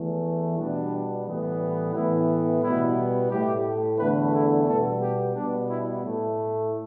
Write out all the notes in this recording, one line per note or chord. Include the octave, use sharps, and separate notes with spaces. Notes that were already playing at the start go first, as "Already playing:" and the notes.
Already playing: E2 E3 A3
B2 G3 B3 D4
A2 E3 G3 B3
A2 E3 B3 E4
B2 G3 B3 E4
A2 A3 G4
E2 D3 A3 B4
E4
B2 G3 B3 A4
G4
B2 G3 B3 D4
E4
A2 A3